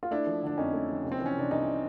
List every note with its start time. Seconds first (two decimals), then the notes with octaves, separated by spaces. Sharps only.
0.03 F4
0.11 A3 D4 E4
0.27 F3
0.43 D3 D4
0.58 F2 C#4 D#4
0.73 A3
0.90 F3
1.04 C2
1.12 C4
1.20 E3
1.26 C#4
1.36 C3 D4
1.51 C2 C#4 D#4